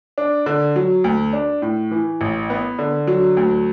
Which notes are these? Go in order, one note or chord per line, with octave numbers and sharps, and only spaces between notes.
D4
D3
F#3
D2
D4
A2
E3
A1
B3
D3
F#3
D2